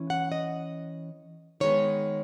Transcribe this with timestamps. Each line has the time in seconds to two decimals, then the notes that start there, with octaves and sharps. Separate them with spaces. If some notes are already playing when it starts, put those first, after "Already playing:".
Already playing: E3 C#4
0.10 F#5
0.32 D#5
1.60 D#3 G#3 B3 C#5